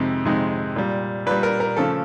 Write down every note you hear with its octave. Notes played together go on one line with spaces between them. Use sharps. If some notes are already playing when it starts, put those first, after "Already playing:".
Already playing: F2 C3 D#3 G#3
F2 C3 D#3 G#3
A#2 G3
A#2 G3 B4
A#4
A#4
C#3 F3 A3 A4